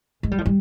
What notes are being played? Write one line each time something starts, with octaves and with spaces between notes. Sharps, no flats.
G#3
G3
F3
G3